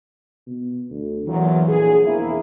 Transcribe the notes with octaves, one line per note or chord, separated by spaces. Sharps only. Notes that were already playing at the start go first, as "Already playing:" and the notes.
B2
D2
E2 A#2 E3 F#3
A#1 G#4
E1 A#3 C4 E4